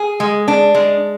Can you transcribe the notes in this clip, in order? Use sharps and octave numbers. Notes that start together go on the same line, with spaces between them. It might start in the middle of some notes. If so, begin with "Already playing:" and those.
Already playing: G#4
G#3
D4
G#3